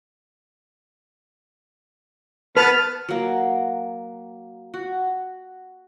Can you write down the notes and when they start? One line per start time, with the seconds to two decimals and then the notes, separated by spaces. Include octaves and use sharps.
2.57 B3 B4 A5 F6
3.09 F#3 A#3
4.74 F#4